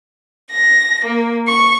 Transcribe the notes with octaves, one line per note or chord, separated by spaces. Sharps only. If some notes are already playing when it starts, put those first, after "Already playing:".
A#6
A#3
C#6